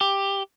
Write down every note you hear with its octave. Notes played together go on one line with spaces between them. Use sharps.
G4